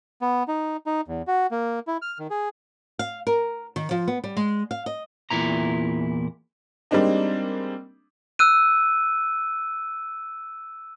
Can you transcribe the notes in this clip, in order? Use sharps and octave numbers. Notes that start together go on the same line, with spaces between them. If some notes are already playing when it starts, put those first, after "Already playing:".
B3
D#4
D#4
E2
F#4
A#3
E4
F6
D#3
G#4
F5
A#4
D#3
F3
B3
G3
G#3
F5
D#5
E2 A#2 E4 A#5
G3 G#3 A#3 C4 D4 D#4
E6 F#6 D#7